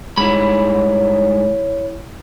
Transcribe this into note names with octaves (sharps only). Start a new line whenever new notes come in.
G#2 G3 G#3 E4 C#5 B5